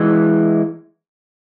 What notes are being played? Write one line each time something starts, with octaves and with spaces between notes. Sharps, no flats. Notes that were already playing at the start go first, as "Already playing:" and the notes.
Already playing: E3 G#3